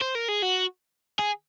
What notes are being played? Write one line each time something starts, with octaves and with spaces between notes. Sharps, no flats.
C5
A#4
G#4
F#4
G#4